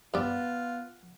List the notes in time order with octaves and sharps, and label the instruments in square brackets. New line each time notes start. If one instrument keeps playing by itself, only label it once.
[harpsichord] G2 D5 [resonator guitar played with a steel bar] B3 [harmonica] F4